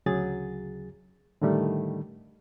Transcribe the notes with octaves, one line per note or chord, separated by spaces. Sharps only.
D2 C#3 F#3 G#4 A6
A2 D3 D#3 G3 A3